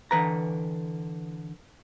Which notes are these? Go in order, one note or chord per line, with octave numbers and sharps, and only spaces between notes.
D3 E3 B4 A#5